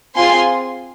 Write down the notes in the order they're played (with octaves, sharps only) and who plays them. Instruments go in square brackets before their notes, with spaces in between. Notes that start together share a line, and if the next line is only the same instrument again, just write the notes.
[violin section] C4 F4 G#4 G#5 C6